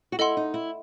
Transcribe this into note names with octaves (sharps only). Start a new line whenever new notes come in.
F#4
E4 A4 D#5 F#5 C6
D#4
E4